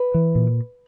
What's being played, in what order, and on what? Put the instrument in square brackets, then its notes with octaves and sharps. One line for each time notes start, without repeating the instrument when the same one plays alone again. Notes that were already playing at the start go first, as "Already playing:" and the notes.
Already playing: [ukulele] B4
[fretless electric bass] E3
A#2